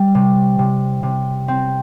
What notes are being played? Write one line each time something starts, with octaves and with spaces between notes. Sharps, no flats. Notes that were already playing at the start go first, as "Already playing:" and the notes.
Already playing: G3
C3
C3
C3
C4